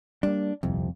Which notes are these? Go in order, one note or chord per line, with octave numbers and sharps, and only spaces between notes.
G3 A#3 D4
D#1 C2 F2 C3